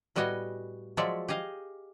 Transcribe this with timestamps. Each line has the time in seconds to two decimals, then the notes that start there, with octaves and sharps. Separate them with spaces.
0.16 A2 G3 B3 F#4 D#5 G#5
0.97 F3 F#3 G#3 C#5 D5 E5
1.28 G4 G#4 D#5 F5